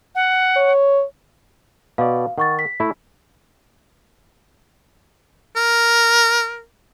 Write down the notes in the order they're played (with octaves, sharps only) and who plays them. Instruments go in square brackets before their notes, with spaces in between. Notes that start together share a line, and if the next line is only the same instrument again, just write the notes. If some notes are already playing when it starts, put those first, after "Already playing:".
[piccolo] F#5
[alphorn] C#5
[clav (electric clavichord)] B2 D5 [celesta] F5
[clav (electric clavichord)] D#3 [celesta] F#5 C#6 A6
[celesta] B6
[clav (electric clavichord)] A3 E4
[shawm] A#4